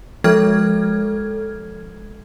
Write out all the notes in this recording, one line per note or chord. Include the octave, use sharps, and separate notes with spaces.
F3 G#3 A4 F6 G#6